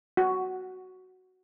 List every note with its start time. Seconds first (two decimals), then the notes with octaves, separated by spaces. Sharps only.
0.17 F#4